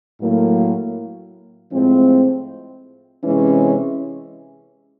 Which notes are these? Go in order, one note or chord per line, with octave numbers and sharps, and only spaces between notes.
A2 F#3 A#3
A2 F3 G#3 C4
C3 E3 G#3 C#4